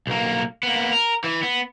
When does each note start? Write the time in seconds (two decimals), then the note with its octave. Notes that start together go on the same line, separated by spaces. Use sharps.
0.07 B1 A#3
0.63 A#3 B3
0.92 A#4
1.24 E3
1.43 B3